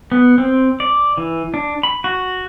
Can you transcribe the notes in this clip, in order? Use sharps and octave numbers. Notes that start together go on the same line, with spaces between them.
B3
C4
D5
E3
D4
B5
F#4